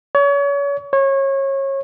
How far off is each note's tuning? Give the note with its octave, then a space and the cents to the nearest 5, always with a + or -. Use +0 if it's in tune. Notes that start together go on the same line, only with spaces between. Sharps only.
C#5 +35
C#5 -25